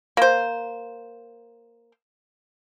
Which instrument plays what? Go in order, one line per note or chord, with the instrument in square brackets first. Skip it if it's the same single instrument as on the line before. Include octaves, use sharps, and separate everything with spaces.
[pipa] A#3 C5